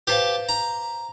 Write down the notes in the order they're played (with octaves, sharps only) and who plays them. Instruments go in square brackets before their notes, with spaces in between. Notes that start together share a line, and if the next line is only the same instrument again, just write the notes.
[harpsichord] G4 A5 [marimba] B4 C5 F5
[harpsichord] A#5